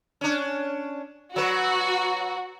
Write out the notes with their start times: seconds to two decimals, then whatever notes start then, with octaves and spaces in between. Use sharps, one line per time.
0.21 C#4 D4
1.36 F#3 F#4 B4